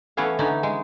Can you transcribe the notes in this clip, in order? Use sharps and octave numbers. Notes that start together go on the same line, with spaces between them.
E3 A3 B3 C#4 C#5 F5
D3 E3 C#4 D#4
G#3